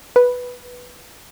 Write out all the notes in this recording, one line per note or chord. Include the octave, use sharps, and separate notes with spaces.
B4